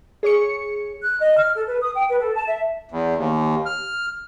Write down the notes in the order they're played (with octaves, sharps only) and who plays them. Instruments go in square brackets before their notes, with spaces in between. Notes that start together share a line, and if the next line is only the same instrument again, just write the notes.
[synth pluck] G#4 C#5 C#6 C#7
[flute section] F#6
D#5
F6
A4
B4
D#6
G5
B4
A4
A5
E5
[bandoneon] E2
D#2
F6